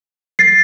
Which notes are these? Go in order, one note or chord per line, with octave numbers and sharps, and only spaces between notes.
A6 C7